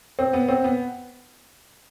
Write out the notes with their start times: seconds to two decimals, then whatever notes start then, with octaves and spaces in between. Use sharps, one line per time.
0.19 C4
0.33 B3
0.49 C4
0.64 B3